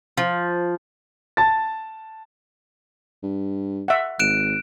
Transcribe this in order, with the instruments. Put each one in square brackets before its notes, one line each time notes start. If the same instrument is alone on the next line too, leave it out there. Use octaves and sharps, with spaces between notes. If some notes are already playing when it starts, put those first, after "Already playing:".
[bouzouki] F3
[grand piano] A5 A6
[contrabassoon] G2
[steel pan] E5 F#5
[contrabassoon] G#1 [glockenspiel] F#6 D7 E7